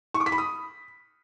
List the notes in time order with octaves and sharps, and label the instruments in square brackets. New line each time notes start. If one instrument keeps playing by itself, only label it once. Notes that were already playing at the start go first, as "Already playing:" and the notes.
[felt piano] C#6
D6
B6
B5
D#6